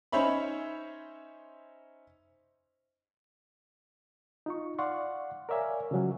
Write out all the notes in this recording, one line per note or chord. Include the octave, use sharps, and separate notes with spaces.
C#4 D#4 C5 C#5 E5 B5
D#4 F4 C#6
D5 F5 F#5 C6 C#6
A#4 C#5 D5 E5 F5 G#5
C#3 F3 F#3 C#4